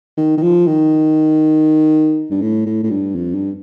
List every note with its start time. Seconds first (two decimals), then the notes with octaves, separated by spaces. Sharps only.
0.17 D#3
0.37 D#3
0.43 F3
0.67 D#3
2.31 G2
2.42 A2
2.66 A2
2.83 A2
2.90 G2
3.15 F2
3.34 G2